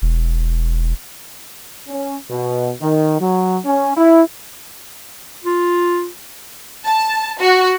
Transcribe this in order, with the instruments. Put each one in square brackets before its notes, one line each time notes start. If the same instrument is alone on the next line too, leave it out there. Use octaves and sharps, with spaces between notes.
[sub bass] E1
[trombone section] C#4
B2
D#3
F#3
C#4
E4
[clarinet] F4
[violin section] A5
F#4